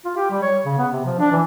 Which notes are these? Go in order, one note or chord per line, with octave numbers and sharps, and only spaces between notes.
F4
G4
G3
C#5
C#3
B3
C3
F3
D4
E3